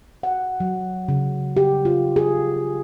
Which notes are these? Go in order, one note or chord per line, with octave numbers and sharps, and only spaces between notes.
F#5
F#3
C#3
G4
F4
G#4